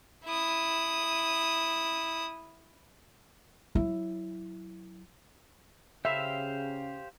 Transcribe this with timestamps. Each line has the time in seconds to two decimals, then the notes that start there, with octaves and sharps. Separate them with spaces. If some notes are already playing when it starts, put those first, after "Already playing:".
0.25 E4 D#6
3.75 F#3 E4
6.05 C#3 G4 C5 E5 F5